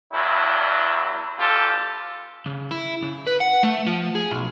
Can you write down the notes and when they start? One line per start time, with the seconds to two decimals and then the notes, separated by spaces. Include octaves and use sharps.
0.13 E2 G2 F#3 E4
1.39 A1 F4 G4 A4
2.46 C#3
2.71 E4
3.03 C#3
3.27 B4
3.41 F#5
3.64 A3
3.87 F3
4.15 G#4
4.32 B1